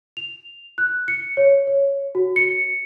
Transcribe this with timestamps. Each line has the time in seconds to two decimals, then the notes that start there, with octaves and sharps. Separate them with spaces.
0.17 F7
0.78 F#6
1.08 C#7
1.37 C#5
1.67 C#5
2.15 F#4
2.36 C#7